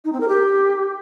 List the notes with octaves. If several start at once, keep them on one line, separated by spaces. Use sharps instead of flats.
D#4
C4
A#4
G4